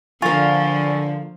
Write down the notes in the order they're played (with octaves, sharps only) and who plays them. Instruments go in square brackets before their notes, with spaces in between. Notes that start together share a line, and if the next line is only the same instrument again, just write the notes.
[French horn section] D3 [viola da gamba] F3 [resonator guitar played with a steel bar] A#3 F4 [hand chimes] G#5 C#6 A6